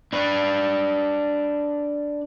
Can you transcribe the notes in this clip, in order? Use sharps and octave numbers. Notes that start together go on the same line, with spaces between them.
D4 B4